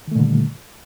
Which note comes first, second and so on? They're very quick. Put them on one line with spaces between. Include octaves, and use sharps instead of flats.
D#3 A3 A#2 D3 G3